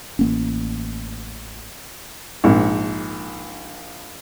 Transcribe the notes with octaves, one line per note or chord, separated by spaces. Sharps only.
A1 A#3 C#4
A#1 G#2